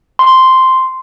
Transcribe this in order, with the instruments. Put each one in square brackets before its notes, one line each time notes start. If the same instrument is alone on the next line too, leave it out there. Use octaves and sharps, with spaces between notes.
[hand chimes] C6